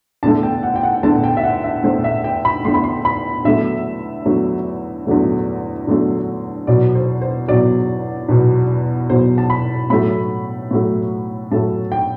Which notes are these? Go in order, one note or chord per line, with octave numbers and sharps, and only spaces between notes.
E2 D3 A3 A5
G5
F#5
G5
F#5
E2 D3 A3 A5
G5
E5
F#5
E5
E2 D3 A3 C5
E5
G5
B5
E2 D3 A3 C6
B5
C6
B5
E2 D3 F#3 A3 E5
E2 D3 F#3 A3
E2 D3 F#3 A3
E2 D3 F#3 A3
E2 B2 F#3 D5
C5
C5
E2 B2 F#3 D5
E2 B2 F#3
E2 B2 F#3 C5
A5
B5
A2 F#3 A3 B5
A2 F#3 A3
A2 F#3 A3 A5
G5